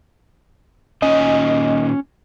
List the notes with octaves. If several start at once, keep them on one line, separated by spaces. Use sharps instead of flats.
A#2 D#3 C#4 D#5 G#5